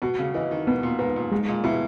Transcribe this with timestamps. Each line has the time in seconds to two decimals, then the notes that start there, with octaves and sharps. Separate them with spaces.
0.02 B2 F#4
0.19 C#3
0.34 E3 D#5
0.51 D#3
0.67 B2 B3
0.83 A#2
0.99 G#2 B4
1.16 A#2
1.31 G#2 G#3
1.48 A#2
1.64 B2 E4